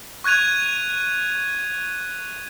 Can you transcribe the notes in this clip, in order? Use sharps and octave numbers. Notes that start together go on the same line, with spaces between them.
C#6 F#6 G#6 D#7 F7